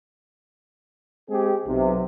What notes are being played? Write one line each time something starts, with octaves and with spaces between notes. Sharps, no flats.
G#3 C4 G4 G#4
B1 C3